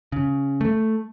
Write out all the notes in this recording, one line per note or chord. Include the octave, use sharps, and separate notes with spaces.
C#3
A3